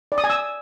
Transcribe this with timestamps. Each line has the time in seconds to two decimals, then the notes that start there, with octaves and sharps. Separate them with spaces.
0.12 D5
0.18 D#6
0.24 G#5
0.30 E6